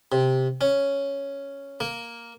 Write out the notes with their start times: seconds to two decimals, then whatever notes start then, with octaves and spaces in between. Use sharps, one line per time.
0.12 C3
0.61 C#4
1.80 A#3